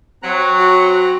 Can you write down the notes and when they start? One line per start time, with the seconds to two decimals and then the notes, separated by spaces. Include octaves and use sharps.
0.23 F#3 C4 A#5 F#6
0.60 F#4